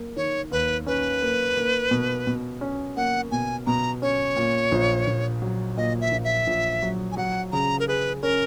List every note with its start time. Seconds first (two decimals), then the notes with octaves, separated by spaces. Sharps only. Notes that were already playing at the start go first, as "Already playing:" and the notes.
Already playing: A#3
0.17 D#3 C#5
0.51 D#2 B4
0.87 C#4 B4
1.22 A#3
1.57 A#3
1.91 B2
2.27 B2
2.61 C#4
2.97 A#3 F#5
3.31 B2 G#5
3.66 B2 A#5
4.02 C#4 C#5
4.36 A#2
4.72 A#1
5.07 A#1
5.42 F#3
5.77 A#2 D#5
6.01 E5
6.12 A#1
6.24 E5
6.47 A#1
6.82 F#3
7.12 G#5
7.17 F#3 F#5
7.52 C#3 A#5
7.80 A#4
7.88 G#4 B4
8.22 C#4 A#4